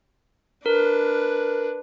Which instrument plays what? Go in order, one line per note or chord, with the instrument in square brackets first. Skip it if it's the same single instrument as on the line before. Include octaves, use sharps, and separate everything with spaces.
[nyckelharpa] D4 B4 [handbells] A#4